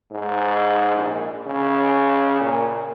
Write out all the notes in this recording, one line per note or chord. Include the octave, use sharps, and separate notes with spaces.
G#2
A#1
C#3
A#2